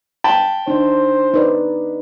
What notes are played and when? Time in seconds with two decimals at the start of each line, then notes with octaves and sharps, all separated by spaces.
0.24 G5 A5 B5
0.68 D4 D#4 C5
1.34 D#4 B4 D5